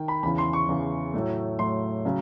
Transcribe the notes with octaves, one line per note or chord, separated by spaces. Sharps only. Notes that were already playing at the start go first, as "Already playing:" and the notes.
Already playing: D#3 G5
B5
E2 C#3 E3 B5
C6
C#6
E2 C#3 E3
A2 F#3 A3
A2 F#3 A3 C6
C#3 F#3